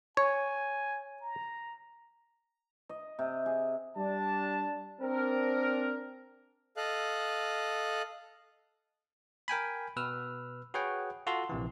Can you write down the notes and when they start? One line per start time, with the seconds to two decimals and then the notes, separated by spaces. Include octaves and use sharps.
0.17 C#5 G#5
1.22 A#5
2.89 D#5
3.19 C3
3.46 G#4
3.97 G3 D4 A5
5.01 C4 D4 A#4
6.77 A4 D#5 F5 F#6
9.48 A#4 G5 G#5 B5
9.96 B2 B4 E6 F6
10.74 F#4 G#4 B4 C#5 F#5 G5
11.27 F4 F#4 A4 C6
11.49 A#1 C3 E3